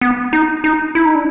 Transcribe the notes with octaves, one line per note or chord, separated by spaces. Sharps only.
B3
D#4
D#4
E4
D#4
D4